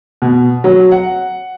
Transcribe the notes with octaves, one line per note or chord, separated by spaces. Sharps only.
B2
F#3
F#5